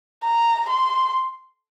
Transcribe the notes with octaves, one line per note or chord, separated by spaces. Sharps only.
A#5
C6